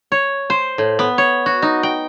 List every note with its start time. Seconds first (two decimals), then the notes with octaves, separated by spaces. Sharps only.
0.12 C#5
0.50 C5
0.78 A2
0.99 B3
1.18 C#5
1.46 F#4
1.62 D#4
1.83 G5